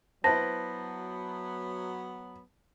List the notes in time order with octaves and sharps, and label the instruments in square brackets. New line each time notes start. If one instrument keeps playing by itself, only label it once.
[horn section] F#3 B3 [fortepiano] E4 B4 C5 [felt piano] A5 [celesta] A#6